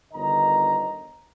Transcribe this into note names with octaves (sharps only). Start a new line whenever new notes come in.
G1 D3 D#3 D#5 A#5